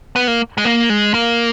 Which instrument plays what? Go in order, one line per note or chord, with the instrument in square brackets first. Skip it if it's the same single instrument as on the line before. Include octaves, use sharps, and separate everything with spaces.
[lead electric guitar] B3
A#3
G#3
A#3
G#3
A#3